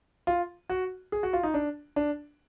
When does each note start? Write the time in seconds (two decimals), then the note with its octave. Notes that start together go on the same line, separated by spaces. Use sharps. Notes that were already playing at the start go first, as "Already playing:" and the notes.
0.27 F4
0.70 F#4
1.12 G#4
1.23 F#4
1.33 F4
1.43 D#4
1.54 D4
1.96 D4